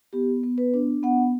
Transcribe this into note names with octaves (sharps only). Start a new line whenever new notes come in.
B3 G4
B3
B4
D4
B3 F#5